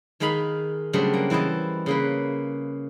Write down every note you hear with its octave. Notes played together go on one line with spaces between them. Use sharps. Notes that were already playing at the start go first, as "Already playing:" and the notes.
D#3 G#3 D#4 F5 B5
C#3 F#3 G3 A3 C4 D4
A#3
E3 E4 C5 D#5 A5
C#3 A#3 B4